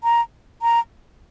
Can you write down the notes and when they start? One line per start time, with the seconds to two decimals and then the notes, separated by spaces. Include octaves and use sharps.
0.04 A#5
0.62 A#5